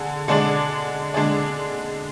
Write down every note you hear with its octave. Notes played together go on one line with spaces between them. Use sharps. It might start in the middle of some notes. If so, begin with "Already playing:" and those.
Already playing: D3 G#4
D3 G#3 D4 G#4 D5
D3 G#3 D4 G#4 D5